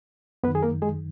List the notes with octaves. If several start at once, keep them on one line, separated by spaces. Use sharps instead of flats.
F#2 D#3 B3 B4
G#4
A#3 A#4
G#3 G#4